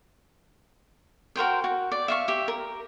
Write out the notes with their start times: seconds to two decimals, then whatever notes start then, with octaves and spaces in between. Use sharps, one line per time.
1.36 F#4 A#4 C5 G5
1.64 F#4
1.92 D5
2.08 E5 F5 C#6
2.28 G4 E5
2.48 A#4